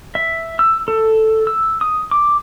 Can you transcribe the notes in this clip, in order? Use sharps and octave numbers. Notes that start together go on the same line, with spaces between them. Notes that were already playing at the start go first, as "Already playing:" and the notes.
E5
E6
A4
E6
D#6
D6